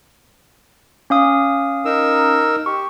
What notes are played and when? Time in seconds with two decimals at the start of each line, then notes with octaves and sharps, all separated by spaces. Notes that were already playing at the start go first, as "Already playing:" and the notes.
1.10 C#4 F5 D#6
1.85 D#4 A#4 E6
2.66 G4 C#6